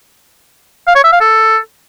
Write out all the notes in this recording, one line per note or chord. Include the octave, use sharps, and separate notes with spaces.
F5
C#5
E5
F5
A4